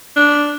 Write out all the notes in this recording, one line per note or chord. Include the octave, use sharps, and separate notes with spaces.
D4